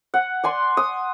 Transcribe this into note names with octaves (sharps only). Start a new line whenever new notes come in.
F#5
D5 G#5 C6
D#6